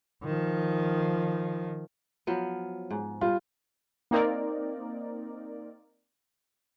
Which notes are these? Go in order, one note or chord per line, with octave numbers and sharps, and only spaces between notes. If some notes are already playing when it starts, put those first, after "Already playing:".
D#3 F3
F3 F#3 B3
G#2
G3 F4
A#3 C4 D#4 A#4 D5